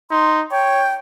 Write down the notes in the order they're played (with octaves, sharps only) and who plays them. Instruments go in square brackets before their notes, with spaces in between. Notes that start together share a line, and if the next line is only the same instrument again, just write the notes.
[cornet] D#4 [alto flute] C6
[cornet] C#5 [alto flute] G5